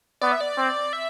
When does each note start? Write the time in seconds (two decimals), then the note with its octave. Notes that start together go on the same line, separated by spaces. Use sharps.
0.21 B3 D5
0.32 E5
0.41 D5
0.57 C4
0.93 E5